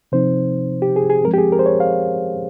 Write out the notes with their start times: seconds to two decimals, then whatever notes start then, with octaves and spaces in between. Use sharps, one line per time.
0.12 C3 F3 C4 D#4 C5
0.82 G4
0.96 G#4
1.10 G#4
1.24 F3 G#3 C4 A#4
1.34 G4
1.38 G#4
1.52 A#4
1.59 C5
1.66 C#5
1.80 F5